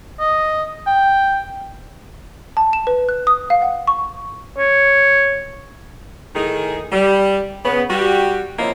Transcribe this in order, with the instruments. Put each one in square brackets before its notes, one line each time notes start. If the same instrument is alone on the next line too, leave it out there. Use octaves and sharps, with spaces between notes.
[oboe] D#5
G5
[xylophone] A5
E7
B4
F#6
D#6
F5
F#5
C#6
[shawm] C#5
[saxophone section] A2 D#3 D#4 G#4
G3
C#3 B3
G3 F#4 G4
F3 A#3 C4 E4 C#5 D#5